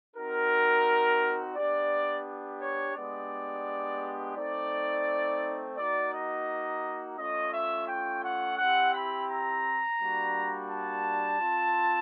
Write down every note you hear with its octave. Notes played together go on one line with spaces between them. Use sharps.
C4 D#4 F#4 A#4
B3 D4 G4 D5
C#5
G#3 B3 D4 G4 D5
A3 C4 D#4 D5
A#3 D#4 F#4 D5
D#5
A3 C#4 F4 D#5
E5
G5
F#5
C4 E4 G4 F#5
B5
A#5
G3 A#3 D4 F#4
A5
C4 F4